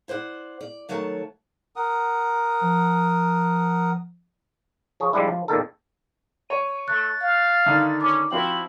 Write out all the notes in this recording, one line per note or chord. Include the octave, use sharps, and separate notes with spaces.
E4 C5 D5 F#5
D5
D#3 F#3 A3 C#5 D5 A5
A#4 F#5 D#6
F3
F3 G#4 C#5
F3 G3 G#3 D4 E4
F3
E2 A#2 D#3 A4
C#5 D#7
A3 F#6 A6
F5
D3 D#3 E5
C#4 D6
F3 C4 E4 F#4 G5 F#7